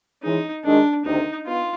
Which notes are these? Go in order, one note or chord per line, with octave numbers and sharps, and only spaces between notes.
E3 G#3 C#4 D#4
F#2 D#3 G#3 D4
D2 C3 D#3 D#4
B3 F4